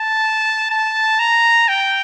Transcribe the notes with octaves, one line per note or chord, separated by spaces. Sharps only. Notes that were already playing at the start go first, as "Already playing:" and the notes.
Already playing: A5
A5
A#5
G5